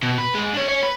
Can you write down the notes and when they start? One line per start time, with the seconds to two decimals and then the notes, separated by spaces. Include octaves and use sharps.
0.03 B2
0.18 B4
0.34 G#2 G#3
0.54 D4 C#5
0.68 C#4 C#5
0.83 B4